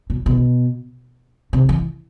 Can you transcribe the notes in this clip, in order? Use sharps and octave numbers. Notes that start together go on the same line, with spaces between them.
B2
B2
C3
E3